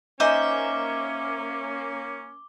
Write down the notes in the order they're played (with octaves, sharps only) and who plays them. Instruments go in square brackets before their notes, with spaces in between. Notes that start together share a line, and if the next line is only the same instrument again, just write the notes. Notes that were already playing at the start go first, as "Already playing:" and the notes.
[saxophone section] A#3 C#4 [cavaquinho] D#4 [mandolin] C5 E5 G#5 [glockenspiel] D6 G7